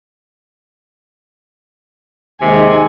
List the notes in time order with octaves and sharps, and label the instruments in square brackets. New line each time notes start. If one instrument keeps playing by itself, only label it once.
[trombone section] D#2 D#3 G#3 [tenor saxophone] C3 [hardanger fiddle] G#5